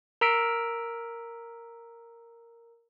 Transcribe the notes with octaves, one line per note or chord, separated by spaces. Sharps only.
A#4 A#5 E6 B6 D7